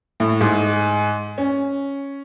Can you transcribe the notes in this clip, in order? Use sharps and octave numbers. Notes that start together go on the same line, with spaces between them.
A2
G#2
C#4